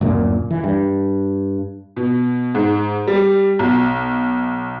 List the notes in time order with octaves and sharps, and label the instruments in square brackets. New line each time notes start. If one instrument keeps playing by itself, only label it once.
[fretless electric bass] D1 F#2 A#2
E3
G2
[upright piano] B2
G#2
G3
B1